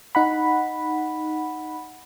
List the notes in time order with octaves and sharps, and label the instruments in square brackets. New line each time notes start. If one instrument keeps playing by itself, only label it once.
[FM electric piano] D#4 F#5 B5